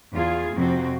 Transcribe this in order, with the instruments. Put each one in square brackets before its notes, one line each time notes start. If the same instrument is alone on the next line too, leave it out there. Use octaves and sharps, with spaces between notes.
[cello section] E2 F4 G#4
F2 C3 C4 F#4